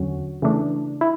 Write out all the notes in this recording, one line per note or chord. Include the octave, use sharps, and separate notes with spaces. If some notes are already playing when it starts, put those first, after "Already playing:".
Already playing: E2 D3 F#3 C#4 F#4
C#3 E3 A3 D4
E4